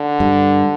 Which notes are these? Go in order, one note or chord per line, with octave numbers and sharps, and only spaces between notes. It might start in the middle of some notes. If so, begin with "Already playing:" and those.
Already playing: D3
G2